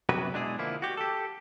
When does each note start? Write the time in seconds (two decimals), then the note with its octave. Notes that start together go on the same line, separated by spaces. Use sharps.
0.09 F#2 C3 F#3 B3 F#4 B4
0.33 B2 G#3 D4 E4 G#4
0.58 D3 F3 A#3 E4
0.82 F#4 G4
0.97 G4 A4